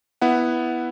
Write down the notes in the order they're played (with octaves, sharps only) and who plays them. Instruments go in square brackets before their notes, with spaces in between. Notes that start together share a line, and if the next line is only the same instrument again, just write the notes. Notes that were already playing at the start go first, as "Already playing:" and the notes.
[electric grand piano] B3 E4 F#5